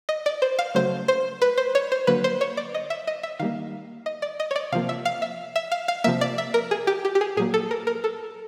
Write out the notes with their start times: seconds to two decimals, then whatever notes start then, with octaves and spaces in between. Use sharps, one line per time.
0.09 D#5
0.26 D5
0.42 C5
0.59 F5
0.75 C#3 F#3 A3 C5
1.08 C5
1.42 B4
1.58 C5
1.75 C#5
1.92 C5
2.07 D3 F#3 A#3 B4
2.24 C5
2.41 C#5
2.57 D5
2.74 D#5
2.90 E5
3.07 D#5
3.23 E5
3.39 D#3 G3 A#3 F5
4.06 D#5
4.22 D5
4.40 D#5
4.51 C#5
4.56 D5
4.72 C3 F3 A#3 F5
4.89 E5
5.05 F5
5.22 E5
5.56 E5
5.72 F5
5.88 F5
6.04 C3 F3 A#3 E5
6.21 D5
6.38 E5
6.54 A#4
6.71 G#4
6.87 G4
7.05 G4
7.15 G4
7.21 G#4
7.37 A#2 F#3 A#3 G#4
7.54 A4
7.71 A#4
7.87 A#4
8.04 A4